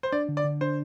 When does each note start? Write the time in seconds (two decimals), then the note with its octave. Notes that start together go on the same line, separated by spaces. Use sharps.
0.03 C5
0.12 D4 D5
0.29 D3
0.37 D5
0.44 D3
0.61 D4 C5